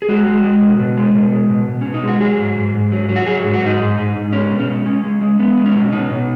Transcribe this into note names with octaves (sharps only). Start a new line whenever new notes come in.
G#4
G#3 F#4
G#3
G#3
B2
B2
G#3
B2
G#3
B2
B2
B2 C#4
D#4
G#3 F#4
F#3 G#4
G#2
G#2
G#2
F#3
F#3
F#4
F#3 G#4
G#2
F#4
G#2 D#4
G#2
G#2
G#2
G#3 C#4
B2
C#4
G#3
G#3 C#4
G#3
G#3
G#3 B3
G#3
C#4
B2
B2 D#4
B2